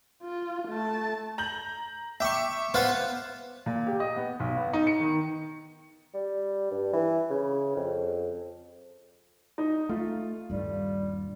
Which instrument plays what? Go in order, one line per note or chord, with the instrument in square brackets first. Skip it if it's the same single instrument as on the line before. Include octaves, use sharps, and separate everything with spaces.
[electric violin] F4
A3 A5
[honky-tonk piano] A#5 G6 F#7
[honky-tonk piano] E5 D6 [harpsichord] G5 C#6
[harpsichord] B3 F4 B4 [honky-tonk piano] C5
[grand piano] A#2
G4
D#5
B3
B1
B3
D#4
C#7
D#3
[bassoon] G3
G2
E3
C#3
F2
[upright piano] D#4
[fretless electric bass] A3 [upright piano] F4
[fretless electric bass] D#1 G2 [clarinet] G3